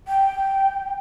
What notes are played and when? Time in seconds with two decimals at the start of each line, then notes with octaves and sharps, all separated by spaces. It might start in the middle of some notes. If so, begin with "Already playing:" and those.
0.08 G5